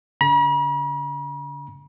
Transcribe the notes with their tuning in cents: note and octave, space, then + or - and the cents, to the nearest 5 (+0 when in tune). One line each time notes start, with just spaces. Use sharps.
D3 -45 B5 -45